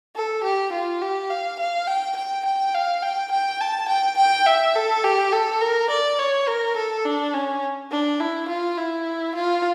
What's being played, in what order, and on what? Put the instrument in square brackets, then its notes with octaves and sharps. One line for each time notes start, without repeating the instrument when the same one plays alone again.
[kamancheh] A4
G4
F4
G4
F5
F5
G5
G5
G5
F5
G5
G5
A5
G5
G5
E5
A4
G4
A4
A#4
D5
C#5
A#4
A4
D4
C#4
D4
E4
F4
E4
F4